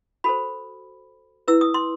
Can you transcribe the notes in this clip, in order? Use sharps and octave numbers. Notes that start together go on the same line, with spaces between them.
F#4 A4 C5 B5
E4 B4 E6
D#6
C6